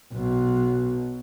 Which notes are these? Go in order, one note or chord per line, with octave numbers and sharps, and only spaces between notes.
B1 B2